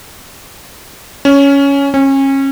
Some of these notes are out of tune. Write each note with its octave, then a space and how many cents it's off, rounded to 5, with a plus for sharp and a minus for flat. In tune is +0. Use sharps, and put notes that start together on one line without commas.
C#4 +10
C#4 -30